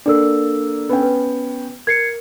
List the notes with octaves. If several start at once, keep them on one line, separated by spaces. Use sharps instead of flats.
A#3 D4 A4 D5 E6
B3 C#4 G5
B4
A#4 G#6 C7 C#7